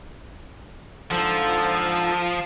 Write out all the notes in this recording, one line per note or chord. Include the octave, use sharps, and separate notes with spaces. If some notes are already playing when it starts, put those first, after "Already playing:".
G#2 D3 F3 A4